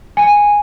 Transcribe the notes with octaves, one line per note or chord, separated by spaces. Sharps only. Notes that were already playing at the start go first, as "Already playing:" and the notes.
G#5